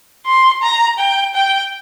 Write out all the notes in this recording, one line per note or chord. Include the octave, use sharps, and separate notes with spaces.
C6
A#5
G5
G5